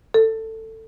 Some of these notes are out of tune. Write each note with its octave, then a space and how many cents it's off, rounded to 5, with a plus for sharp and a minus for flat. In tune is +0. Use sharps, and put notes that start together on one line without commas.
A4 +15